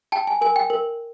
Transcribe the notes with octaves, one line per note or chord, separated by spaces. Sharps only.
G5 A5
G#5
A#4 G#5
G5
A#4